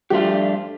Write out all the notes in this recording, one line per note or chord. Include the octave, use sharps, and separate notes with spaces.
G2 F3 A3 D4 F4 G4